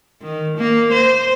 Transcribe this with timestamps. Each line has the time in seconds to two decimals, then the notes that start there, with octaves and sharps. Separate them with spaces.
0.21 D#3
0.57 A#3
0.92 C5